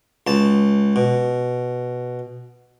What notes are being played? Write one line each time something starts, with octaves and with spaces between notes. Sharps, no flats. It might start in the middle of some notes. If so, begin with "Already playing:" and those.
C#2 A5
B2